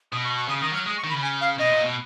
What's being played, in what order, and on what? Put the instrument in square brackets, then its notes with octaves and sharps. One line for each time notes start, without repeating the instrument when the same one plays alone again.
[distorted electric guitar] B2 [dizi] D#6
[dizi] C#6
C#6
[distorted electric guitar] C#3 [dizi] D#6
[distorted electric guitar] D#3 [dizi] D#6
[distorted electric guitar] F#3 [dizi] F6
[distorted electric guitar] G#3 [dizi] D#6
[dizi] C#6
[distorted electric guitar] D#3
[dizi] B5
[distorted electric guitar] C#3
[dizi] G#5
F5
[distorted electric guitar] B2 [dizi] D#5
[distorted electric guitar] A#2
B2